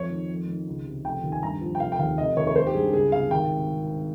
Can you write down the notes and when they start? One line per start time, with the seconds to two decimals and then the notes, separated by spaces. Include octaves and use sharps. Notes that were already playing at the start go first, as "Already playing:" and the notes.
Already playing: F2 C#5
0.10 D#3
0.29 F2
0.48 D#3
0.67 C#2
0.86 C3
1.04 F1 G5
1.23 D#2
1.32 G#5
1.42 G2 A#5
1.61 F3
1.75 G5
1.80 F1 F5
1.92 G5
1.99 D#2 F5
2.18 F1 D#5
2.37 D#2 C#5
2.47 C#5
2.56 G#1 C5
2.67 G4
2.74 G2 G#4
2.93 C#2 G#4
3.12 C3 F5
3.31 G#1 G5